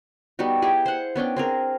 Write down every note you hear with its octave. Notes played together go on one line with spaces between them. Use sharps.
G3 B3 D#4 F#4
E4 G4 G#4
C5 F#5
B3 C#4 D4 G5
C4 G#4 A#4